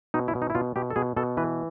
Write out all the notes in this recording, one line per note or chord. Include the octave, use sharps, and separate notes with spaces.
B2 D#4
E4
B2
D#4
E4
B2 F4
B2 G4
A4
B2 G#4
B2 A4
E3 B4